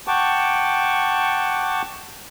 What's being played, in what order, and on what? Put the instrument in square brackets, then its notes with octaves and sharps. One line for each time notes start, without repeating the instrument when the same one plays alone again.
[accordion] F#5 G5 A5 C#6 D6